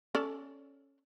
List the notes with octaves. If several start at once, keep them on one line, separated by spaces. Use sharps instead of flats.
C#4 A4 D5